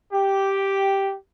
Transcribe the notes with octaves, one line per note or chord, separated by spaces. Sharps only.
G4